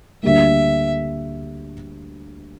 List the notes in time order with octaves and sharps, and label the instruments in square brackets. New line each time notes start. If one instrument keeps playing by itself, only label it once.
[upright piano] D2 D3 G3 A#3 [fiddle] E5